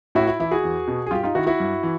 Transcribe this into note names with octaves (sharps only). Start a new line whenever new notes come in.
A2 E4 F#4
E4
E3 E4
F#4 G#4
E2
B2
G#4
G2 F4 G4
D#4 F4
D#3 E4 F#4
E4 F#4
G2
E3